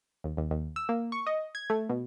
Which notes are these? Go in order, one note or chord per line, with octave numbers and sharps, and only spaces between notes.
D#2
D#2
D#2
E6
A#3
C#6
D#5
G#6
A3
B2